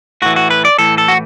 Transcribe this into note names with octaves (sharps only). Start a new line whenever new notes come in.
A2 E3 F#4
F#4
B4
D5
A2 E3 A4
A4
F#4